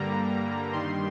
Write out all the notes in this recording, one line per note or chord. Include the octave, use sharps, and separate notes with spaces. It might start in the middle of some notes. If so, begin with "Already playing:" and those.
Already playing: G2 D3 G3 A#3 A#5
G2 D#3 G3 C6